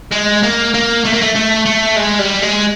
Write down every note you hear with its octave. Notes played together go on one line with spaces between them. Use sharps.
G#3
A#3
A#3
A3
A#3
A3
A3
A3
G#3
G3
G#3